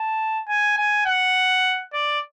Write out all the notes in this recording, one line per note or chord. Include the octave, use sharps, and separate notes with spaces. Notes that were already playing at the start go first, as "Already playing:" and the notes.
Already playing: A5
G#5
G#5
F#5
D5